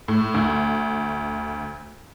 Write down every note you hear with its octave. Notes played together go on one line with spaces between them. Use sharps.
A2
D2